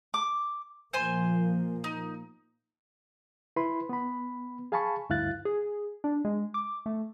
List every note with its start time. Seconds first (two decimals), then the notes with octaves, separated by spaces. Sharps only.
0.14 D6
0.93 A#2 F3 A#3 C5 G#5 C6
1.84 D#4
3.56 E4 B4 B5 C6
3.89 B3 B5
4.72 G#4 F5 G#5 A5 B5 C#6
5.10 D2 G2 E4 F5 F#6 A6
5.45 G#4
6.04 D4
6.25 G#3
6.54 D6
6.86 A3